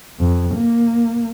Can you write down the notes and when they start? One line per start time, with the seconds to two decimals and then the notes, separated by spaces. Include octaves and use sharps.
0.20 F2
0.55 A#3